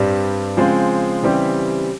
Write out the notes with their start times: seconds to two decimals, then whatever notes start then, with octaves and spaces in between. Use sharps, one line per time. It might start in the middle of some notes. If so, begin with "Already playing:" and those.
Already playing: G2 G3 C4
0.57 C#3 F3 G#3 C4
1.23 C#3 E3 G3 C4 G4